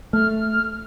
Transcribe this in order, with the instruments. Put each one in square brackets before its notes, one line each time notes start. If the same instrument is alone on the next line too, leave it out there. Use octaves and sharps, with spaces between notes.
[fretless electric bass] A3 [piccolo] F6